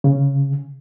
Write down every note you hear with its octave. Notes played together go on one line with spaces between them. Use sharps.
C#3